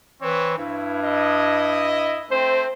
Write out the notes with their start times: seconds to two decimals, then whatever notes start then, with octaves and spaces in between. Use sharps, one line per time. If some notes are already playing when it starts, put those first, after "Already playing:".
0.22 E3 C4 B4 C#5
0.58 G2 E4
1.03 E4 D#5
2.31 A3 C4 C5